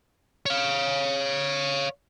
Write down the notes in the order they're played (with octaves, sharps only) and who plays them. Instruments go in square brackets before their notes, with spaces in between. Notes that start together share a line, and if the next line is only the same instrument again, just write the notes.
[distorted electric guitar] C#5 F5